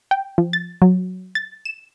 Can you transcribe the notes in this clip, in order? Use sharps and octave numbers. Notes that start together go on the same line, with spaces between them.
G5
F3
A6
F#3
A6
E7